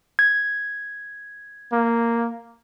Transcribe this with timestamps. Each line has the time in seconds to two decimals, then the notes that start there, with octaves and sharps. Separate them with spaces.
0.19 G#6
1.73 A#3